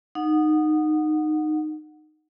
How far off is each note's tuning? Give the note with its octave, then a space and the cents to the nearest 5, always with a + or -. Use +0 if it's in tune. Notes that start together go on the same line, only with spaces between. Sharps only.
D#4 -15 F#5 -15